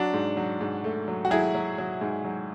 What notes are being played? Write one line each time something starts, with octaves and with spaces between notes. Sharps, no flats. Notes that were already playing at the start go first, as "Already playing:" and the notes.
Already playing: F#3 D4 F#4
G#2
F#3
G#2
A3
F#3
F#4
F#3 E4 G#4
F#3
F#3
G#2
F#3